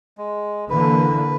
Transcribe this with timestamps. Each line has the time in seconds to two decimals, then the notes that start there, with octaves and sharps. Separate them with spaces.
0.18 G#3
0.70 D3 E3 A#3 B4